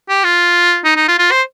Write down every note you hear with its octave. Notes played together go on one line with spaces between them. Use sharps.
G4
F4
D#4
D#4
F4
F4
C5